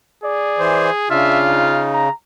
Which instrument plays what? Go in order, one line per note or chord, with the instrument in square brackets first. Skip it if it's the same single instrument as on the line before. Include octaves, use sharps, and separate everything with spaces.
[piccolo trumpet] G#4 [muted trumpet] D5
[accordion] E3 C5
[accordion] C#3 [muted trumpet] D4 [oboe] F4 [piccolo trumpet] E5
[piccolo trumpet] D#4
[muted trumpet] A#5